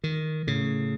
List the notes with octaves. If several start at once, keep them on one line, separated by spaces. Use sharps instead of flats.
D#3
A2 C#3